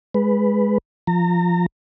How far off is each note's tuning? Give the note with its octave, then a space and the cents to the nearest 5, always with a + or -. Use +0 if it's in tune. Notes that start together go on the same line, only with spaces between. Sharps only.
G#3 +0 B4 +0
F3 +0 A#5 -30